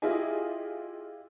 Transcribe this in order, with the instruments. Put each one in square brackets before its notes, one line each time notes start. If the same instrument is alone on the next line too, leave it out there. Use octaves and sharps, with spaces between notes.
[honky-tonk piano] E4 F4 G4 G#4 D#5 G#5